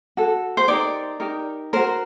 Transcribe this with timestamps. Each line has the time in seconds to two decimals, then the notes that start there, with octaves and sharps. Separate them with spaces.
0.17 F#4 A4
0.57 C5
0.68 D#4 G4 A#4 D5
1.20 D#4 G4 A#4
1.73 F#4 A#4 C5